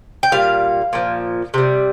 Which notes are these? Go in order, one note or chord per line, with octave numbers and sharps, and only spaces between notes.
G5
A#2 G3 F5
A#2 F3
C3 G3